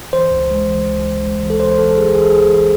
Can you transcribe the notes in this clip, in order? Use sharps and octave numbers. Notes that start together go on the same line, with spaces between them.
E3 C5
C#2
G#3
E3
C#2
C#2
G#3
E3
A4
E3 C5
C5
E3 A4
A4
C#2 G#4
E3 G#4
A4
C#2 G#4
E3